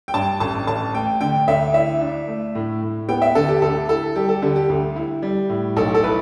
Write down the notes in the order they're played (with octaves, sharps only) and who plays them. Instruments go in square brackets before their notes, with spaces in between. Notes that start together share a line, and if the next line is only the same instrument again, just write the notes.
[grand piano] G5
G2 A5
A1 A5
A1 A5
A3 G5
D3 G5
D2 E5
E4 E5
D4
A3
A2
A2
B3 G5
E5
D3 A4
G4
D2 A4
E4 A4
G3 G4
A4
D3 G4
G4
D2
E4
G3
A2
B1 A4
A4
E4 B4